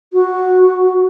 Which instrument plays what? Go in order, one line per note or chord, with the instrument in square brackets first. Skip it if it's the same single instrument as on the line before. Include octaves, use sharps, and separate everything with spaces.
[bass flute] F#4